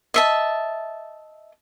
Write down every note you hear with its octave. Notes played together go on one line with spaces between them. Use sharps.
D#5 E5 A5